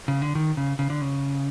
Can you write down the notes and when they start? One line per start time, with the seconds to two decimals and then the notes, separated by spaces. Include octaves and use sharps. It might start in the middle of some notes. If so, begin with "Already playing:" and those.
0.08 C#3
0.22 D3
0.35 D#3
0.57 C#3
0.79 C#3
0.90 D3
1.01 C#3